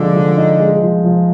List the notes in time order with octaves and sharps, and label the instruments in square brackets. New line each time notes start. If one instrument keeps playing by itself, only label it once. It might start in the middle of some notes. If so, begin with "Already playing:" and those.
Already playing: [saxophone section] D3 [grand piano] F3 G#3 D#4
[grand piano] F3
D#4
G#3
F3
F3